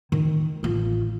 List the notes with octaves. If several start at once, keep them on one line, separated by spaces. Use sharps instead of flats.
D#3
A1 F4